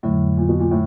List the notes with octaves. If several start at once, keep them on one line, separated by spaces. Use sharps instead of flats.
F2 A2 D3 F#3
A#2
B2
A#2
A2